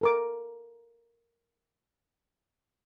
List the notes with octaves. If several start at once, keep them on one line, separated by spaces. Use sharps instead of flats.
A4 A#4 D6